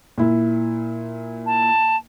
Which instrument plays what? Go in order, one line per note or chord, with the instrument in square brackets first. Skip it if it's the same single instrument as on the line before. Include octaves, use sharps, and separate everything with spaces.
[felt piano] A#2 E4
[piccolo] A5